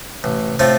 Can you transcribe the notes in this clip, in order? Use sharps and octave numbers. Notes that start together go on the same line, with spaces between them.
A1 C3
A2 C3 A3 C4 F4